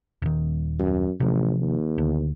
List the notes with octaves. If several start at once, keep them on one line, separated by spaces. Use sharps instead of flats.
D#1 D#3
F#2
A1 C3 F3
D#2
D2